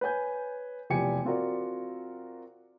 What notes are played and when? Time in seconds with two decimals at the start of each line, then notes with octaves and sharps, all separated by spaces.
0.01 B4 C#5 G#5 G6
0.90 F1 E2 G4 G#5 C#7
1.25 C4 F4 F#4 A#4 D5